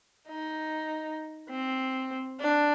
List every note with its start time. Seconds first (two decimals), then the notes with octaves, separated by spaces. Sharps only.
0.29 D#4
1.50 C4
2.40 D4